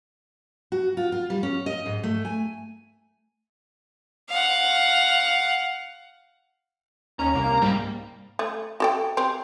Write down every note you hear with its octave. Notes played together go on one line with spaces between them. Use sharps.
F#4
F4
F4
G3
C#4
D#5
G#2
A3
G#5
F5 F#5
D#2 C#4 A#5
C2 A#3
G#2 G3 A#3
A3
F#4 A4 G5
C4 G4